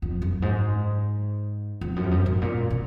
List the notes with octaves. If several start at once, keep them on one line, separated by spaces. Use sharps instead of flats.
F2
F#2
G#2
F2
F#2
F2
F#2
G#2
A#2
A#2